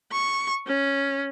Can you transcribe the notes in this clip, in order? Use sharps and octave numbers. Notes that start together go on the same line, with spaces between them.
C#6
C#4